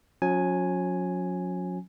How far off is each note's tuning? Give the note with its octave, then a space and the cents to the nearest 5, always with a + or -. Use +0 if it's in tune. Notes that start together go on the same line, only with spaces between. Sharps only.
F#3 -40 C#4 +0 G#5 +0